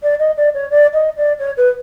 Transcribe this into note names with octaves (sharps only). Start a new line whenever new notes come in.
D5
D#5
D5
C#5
D5
D#5
D5
C#5
B4